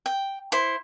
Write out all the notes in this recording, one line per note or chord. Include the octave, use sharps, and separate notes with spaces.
G5
E4 C5